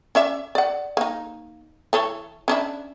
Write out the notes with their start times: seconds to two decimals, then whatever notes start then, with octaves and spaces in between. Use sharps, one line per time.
0.15 C#4 D5 E5
0.55 D5 F#5
0.97 A#3 D#4
1.93 E3 A4 C#5
2.48 C#4 D4 E4